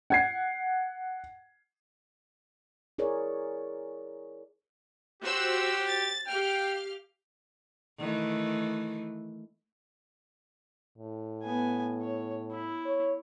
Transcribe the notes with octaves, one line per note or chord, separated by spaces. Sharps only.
F#5 G#6 C7
E4 G#4 A#4 C#5 D5
F#4 G4 C5 E6
A6
G4 F5 G5 F6
D#3 E3 A3
A2
B3 G#5
C#5
E4
C#5